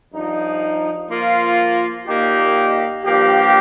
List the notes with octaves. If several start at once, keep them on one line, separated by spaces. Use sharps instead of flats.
G2 F3 D#4
F3 A#3 F4
A#2 A#3 D#4 G4
G2 F3 A#3 G4